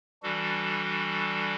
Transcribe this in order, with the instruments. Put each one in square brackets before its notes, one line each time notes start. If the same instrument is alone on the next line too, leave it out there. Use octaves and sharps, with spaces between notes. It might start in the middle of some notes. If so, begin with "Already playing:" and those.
[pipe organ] E3 G3 D4 F#4 A4